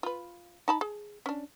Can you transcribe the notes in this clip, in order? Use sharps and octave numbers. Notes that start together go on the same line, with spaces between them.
F4 B4
D#4 A5 B5
G#4
C#4 D4